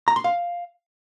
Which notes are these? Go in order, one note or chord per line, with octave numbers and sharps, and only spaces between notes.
A#5
C6
F5